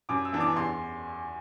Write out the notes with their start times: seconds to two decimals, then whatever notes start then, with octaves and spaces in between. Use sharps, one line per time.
0.09 F#2 D6
0.25 E6
0.33 E3 B3 D4
0.40 D6
0.56 E2 C6